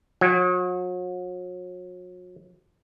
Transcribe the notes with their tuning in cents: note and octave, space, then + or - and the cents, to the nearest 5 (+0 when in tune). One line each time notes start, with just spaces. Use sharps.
F#3 -40